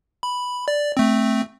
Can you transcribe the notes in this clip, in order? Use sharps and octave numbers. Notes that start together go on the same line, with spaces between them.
B5
D5
A3 C4